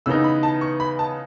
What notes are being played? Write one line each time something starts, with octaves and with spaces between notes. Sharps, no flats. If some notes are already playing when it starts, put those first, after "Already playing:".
C#3 E3 B3 D#4 E6
B5
A5
C#6
B5
A5